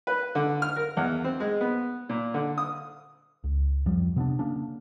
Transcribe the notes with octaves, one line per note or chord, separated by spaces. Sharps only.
B4
D3
F6
A#4
E2
C4
G#3
B3
A#2
D3
D#6
C#2
F2 F3 G3
C3 B3 C#4 D4
C#3 A#3 C#4 D4